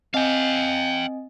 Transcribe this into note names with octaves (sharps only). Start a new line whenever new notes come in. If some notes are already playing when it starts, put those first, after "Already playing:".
C4 D#5 F5 G5 G#5